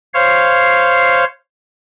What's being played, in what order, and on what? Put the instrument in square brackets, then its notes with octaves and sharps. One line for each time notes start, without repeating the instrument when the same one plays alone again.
[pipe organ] C5 C#5 F5